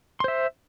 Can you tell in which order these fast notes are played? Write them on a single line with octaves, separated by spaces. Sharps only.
C6 C5 E5